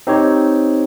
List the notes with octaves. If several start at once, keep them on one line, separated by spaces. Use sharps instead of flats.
C4 D#4 G4 C5 C#5